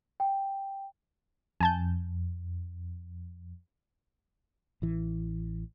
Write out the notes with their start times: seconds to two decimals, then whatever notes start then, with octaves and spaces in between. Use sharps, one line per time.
0.20 G5
1.60 F2 G#5 A5 G6
4.82 A1 E3